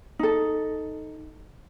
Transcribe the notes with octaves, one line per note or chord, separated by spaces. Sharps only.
D#4 A4